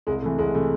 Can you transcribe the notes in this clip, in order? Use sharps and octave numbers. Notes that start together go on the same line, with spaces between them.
C2 G#3
C3 E3 A3
C2 G#3
C3 E3 A3